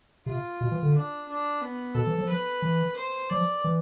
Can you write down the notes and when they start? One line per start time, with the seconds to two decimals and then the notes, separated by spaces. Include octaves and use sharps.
0.26 C3 F4
0.61 B2
0.71 E3
0.83 D3
0.94 D4
1.28 D4
1.61 B3
1.95 B2 A4
2.07 E3
2.18 F3
2.29 B4
2.62 E3
2.96 C5
3.30 F3 D5
3.64 E3